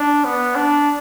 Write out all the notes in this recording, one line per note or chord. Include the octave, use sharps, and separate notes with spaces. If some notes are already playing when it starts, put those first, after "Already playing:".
Already playing: D4
B3
D4